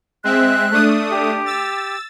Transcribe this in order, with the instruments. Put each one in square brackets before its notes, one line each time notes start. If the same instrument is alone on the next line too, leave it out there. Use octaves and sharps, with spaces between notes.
[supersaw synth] G#3 C4 E5 [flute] F#6
[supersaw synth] A3 D4 D#6
[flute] G4
[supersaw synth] E6 A6